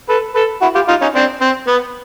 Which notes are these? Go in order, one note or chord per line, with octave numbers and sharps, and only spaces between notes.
A4 B4
A4 B4
E4 F#4
F4 G4
D#4 F4
C#4 D#4
C4 D4
C4
B3